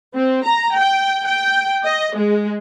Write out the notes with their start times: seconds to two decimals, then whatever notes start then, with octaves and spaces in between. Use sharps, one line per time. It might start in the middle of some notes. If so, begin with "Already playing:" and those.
0.16 C4
0.46 A#5
0.77 G5
1.26 G5
1.85 D#5
2.16 G#3